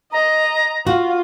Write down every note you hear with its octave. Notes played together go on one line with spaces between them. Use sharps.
D#5 A#5
F4 F#4